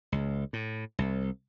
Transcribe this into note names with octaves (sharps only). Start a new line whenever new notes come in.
C#2
A2
C2